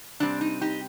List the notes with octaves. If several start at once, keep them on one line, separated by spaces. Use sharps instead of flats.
C3 G3 C4 D4
D#4
D#4 G4